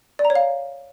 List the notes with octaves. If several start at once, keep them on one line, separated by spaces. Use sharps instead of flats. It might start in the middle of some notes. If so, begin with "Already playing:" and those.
D5
A#5
C#5
F5